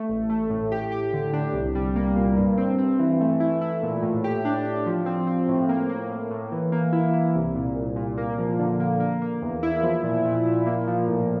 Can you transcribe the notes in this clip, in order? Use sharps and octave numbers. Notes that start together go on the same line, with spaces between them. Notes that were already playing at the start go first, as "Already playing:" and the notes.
Already playing: A3
A1
A3
A2
G4
G4
D3
D4
C2
G3
A#3
A#2
G2
C4
C4
E3
A3
E4
E4
A#2
A2
G4
D4
G4
F3
C4
C4
A2
A#3
A#3
A2
A2
E3
A#3
E4
E4
C2
A#2
C2
A#2
A#3
F3
D3
A#3
A#3
A#3
E2
E4
F3
A#2
A#2
A#2
A#3
F3
A2